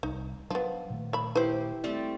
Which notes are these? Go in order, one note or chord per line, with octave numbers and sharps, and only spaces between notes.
C2 D#4
F3 F#3 B3 D4
A#2 D#3 A3
E5 B5
E4 G4 B4 C5
G3 A3 C4